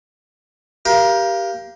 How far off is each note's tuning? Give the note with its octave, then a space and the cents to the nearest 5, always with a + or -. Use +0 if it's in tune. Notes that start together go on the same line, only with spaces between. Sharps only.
G4 +0 A#4 +25 F5 -20